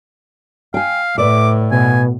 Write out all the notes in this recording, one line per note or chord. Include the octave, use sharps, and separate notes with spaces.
F5 G5 G#5
A2 B4 D5 E5 D6
B2 G#5